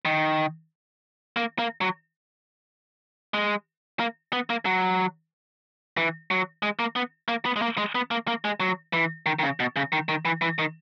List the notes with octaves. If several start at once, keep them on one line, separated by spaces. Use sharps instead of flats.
D#3
A#3
A#3
F#3
G#3
A#3
B3
A#3
F#3
E3
F#3
G#3
A#3
B3
A#3
B3
G#3
A#3
G#3
B3
A#3
A#3
G#3
F#3
E3
D#3
D#3
C#3
B2
C#3
D#3
D#3
E3
E3
D#3